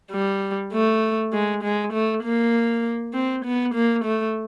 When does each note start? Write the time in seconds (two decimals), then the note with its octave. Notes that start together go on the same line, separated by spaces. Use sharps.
0.12 G3
0.73 A3
1.33 G#3
1.63 G#3
1.93 A3
2.24 A#3
3.14 C4
3.45 B3
3.75 A#3
4.05 A3